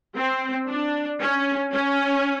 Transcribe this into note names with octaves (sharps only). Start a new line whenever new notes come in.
C4
D4
C#4
C#4